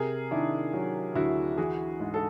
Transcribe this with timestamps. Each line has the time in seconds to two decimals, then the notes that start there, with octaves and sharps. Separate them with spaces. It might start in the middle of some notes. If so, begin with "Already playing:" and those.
Already playing: C3 G#4 A#4
0.31 D#3 D4 E4
0.73 F#3
1.15 D2 E4 F#4
1.57 E3 F#4 G#4
2.00 G#2
2.14 A4